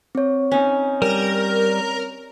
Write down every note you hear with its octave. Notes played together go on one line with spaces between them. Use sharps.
C4 C#5
C#4 D#4
G3 A#4